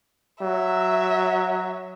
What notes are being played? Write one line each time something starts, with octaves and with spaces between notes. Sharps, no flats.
F#3 E5